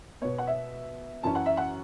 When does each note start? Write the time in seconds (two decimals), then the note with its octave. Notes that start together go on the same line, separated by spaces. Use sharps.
0.22 B2 B3 C#5
0.38 F#5
0.47 E5
1.23 F#2 E3 C#4 A5
1.35 F#5
1.46 E5
1.57 F#5